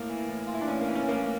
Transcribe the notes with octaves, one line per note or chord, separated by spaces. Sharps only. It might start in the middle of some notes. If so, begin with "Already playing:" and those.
Already playing: A2 A#3
E3
A2
E3 F4
E4
D4
A2 C#4
A#3
E3
C#4
A2 A#3